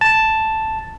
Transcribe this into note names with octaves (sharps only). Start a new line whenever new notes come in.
A5